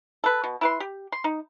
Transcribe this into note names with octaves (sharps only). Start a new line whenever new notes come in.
A4 B4
B2
E4 B4 C6
G4
C6
D#4